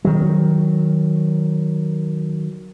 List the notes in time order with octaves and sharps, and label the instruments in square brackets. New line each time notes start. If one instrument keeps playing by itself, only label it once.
[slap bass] D#3 F#3